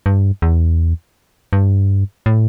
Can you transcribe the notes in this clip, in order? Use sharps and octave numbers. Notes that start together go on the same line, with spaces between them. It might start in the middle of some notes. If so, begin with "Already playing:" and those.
G2
E2
G2
A2